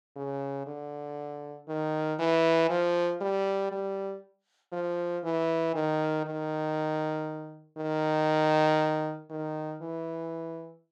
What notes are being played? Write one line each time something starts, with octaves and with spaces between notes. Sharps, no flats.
C#3
D3
D#3
E3
F3
G3
G3
F3
E3
D#3
D#3
D#3
D#3
E3